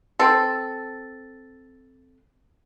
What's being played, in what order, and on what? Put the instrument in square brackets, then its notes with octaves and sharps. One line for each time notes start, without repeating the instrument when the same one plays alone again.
[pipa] C4 A4